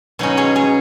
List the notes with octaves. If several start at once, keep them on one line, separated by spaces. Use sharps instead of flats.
B2 F#3 C#4 D#4
G#4 C#5
G#4 C#5